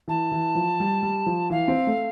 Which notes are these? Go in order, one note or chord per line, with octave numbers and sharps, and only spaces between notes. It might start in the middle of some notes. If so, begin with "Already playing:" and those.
E3 A5
E3
F3
G3
G3
F3
E3 F5
C4
A3